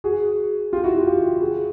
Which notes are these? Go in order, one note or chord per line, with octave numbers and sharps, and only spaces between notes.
F#4 G#4
F4 G4
E4 F#4
F4 G4
F4 G4
F#4 G#4